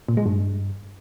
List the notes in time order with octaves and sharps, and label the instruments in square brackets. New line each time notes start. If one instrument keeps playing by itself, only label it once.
[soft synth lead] A#2
G#3
G2